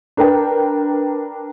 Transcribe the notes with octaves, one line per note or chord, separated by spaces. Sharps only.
D4 A#4 B4 G5